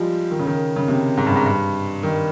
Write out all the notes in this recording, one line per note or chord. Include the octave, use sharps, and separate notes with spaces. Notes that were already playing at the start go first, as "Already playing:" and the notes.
Already playing: F3 G3 G#3
D#3
C#3
D#3
C#3
C3
G#2
G2
G#2
G2
D#3